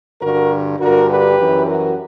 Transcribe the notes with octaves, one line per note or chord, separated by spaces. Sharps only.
G2 D3 F#4 A#4
G2 D3 F#4 A#4
G4 B4
F#2 E3
F#4 A#4